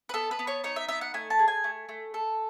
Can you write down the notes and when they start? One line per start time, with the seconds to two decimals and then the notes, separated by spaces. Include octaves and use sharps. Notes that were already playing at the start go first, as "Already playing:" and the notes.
0.09 B4
0.14 B3 A4
0.31 B4
0.39 B3
0.47 C#5
0.64 D#4 C#5
0.76 E5
0.89 B3 E5
1.01 F#5
1.14 A3 G#5
1.30 A5
1.39 G#4
1.48 G#5
1.64 A3
1.89 A3
2.14 A4